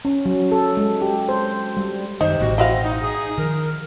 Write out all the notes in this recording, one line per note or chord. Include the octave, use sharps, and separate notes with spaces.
C#4
F#3
A4
G#3
G4
C5
G3
F#2 C3 D#3 D#4 C5
A1 B2 F#4
C4 E4 F#4 D#5 F5
D#4
G#4
D#3 F3 A#4